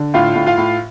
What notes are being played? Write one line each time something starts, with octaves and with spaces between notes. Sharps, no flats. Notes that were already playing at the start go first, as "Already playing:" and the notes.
Already playing: D3
A2 F4 F5
A2
F4 F5
A2